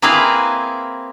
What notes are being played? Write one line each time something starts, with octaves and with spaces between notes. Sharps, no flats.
A#3 C4 E4 G#4 B4 F5